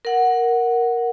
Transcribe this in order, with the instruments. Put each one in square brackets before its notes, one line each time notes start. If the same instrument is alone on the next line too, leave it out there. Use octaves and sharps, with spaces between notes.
[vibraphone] A#4 F#5